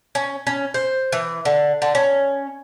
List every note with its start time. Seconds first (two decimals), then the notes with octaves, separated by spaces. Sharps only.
0.15 C#4
0.47 C#4
0.74 C5
1.12 E3
1.45 D3
1.82 D3
1.95 C#4